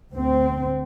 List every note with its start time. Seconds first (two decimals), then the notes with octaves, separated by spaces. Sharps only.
0.13 D2 C4